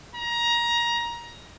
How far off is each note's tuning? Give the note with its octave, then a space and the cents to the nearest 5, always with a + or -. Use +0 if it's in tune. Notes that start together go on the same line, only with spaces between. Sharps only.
A#5 +20